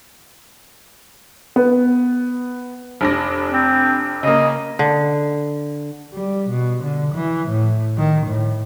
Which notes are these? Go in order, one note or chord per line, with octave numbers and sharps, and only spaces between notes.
B3
F1 D4 A#6
C4
C#3 A#3 D#5
D3
G3
B2
D3
E3
A2
D#3
A2